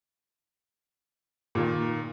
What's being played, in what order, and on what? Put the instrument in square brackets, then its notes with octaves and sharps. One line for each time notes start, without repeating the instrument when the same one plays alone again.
[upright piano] A#2 D#3 A#3